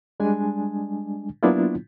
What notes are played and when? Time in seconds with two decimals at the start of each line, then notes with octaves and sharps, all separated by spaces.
0.20 G3 G#3 D4 G#5
1.43 F#3 A#3 B3 D4 E4 F4